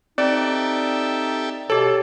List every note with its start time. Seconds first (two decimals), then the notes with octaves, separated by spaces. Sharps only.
0.18 C4 D#4 G4 A4 D5 E5
1.70 B2 G4 A4 C#5